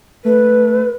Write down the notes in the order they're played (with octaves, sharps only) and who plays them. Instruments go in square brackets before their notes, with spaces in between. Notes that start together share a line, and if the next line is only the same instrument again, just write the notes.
[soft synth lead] A3 [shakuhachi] B4